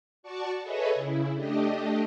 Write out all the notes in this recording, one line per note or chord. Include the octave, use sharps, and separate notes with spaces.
F#4 D5 A5 C#6
G#4 A4 B4 C#5 D#5 E5
C#3 E4
A3 D4 G4 D#5